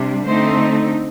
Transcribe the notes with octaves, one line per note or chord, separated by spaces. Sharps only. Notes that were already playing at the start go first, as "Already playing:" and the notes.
Already playing: C3 G3 D4
D3 A3 C4 D#4 C5